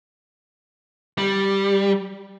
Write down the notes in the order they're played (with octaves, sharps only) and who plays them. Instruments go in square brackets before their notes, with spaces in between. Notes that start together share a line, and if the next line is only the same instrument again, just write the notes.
[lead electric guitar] G3